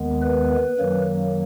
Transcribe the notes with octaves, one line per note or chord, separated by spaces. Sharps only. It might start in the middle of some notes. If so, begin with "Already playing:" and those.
Already playing: D#2 D#3 G#3 B3
B4
F#2 D#3 F#3 A#3